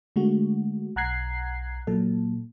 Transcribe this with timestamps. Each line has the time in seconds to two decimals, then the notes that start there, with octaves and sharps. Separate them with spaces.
0.16 D3 G#3 A3 F#4
0.96 B1 F#5 A#5 F#6 G#6 C7
1.87 A#2 F#3 A4